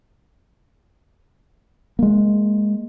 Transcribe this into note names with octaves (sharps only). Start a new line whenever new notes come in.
G#3 A#3